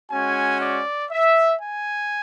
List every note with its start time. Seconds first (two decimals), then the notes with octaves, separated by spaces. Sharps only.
0.10 G#3 C#4 F#4 G#5
0.60 D5
1.10 E5
1.61 G#5